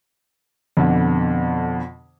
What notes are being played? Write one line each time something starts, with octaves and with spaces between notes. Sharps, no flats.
F2 B2 D3